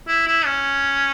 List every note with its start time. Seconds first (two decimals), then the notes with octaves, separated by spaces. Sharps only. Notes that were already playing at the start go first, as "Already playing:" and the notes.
0.08 E4
0.27 E4
0.46 C#4